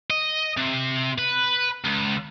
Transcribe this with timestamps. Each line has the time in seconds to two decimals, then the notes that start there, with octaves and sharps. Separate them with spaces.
0.10 D#5
0.57 C3
1.18 B4
1.84 C#2